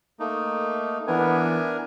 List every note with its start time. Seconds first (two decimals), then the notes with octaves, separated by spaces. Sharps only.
0.20 A3 A#3 D#4
1.07 E3 B3 D4 A#4 G#5